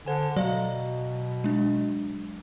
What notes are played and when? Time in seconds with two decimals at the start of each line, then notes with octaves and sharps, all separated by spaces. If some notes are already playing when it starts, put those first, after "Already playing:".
0.06 D3 C5 G#5
0.36 B2 F#3 D5 F5 A#5
1.44 G#3 D4